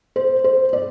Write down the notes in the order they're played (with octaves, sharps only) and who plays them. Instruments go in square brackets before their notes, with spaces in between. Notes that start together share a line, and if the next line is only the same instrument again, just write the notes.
[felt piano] C5
C5
D5